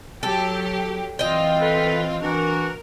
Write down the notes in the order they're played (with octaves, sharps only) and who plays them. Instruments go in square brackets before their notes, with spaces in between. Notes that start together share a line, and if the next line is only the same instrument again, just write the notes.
[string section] F#3 G4 [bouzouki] A4
[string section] E3 C4 F4 [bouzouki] D#5 G5
[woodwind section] A4 B4
[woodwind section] E3 D4 F#4 [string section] A#4